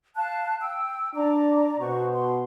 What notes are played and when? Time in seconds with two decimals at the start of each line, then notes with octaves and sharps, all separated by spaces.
0.15 F5 A5 F#6
0.61 G5 E6
1.15 D4 D5 A#5 D6
1.80 B2 F#4 C5 C#6
2.13 C6